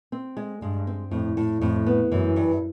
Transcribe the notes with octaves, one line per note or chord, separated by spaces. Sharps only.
C4
G#3
G2 G#3
C4
F2 A2
A2
F2 A2
B3
F#2 E3
G2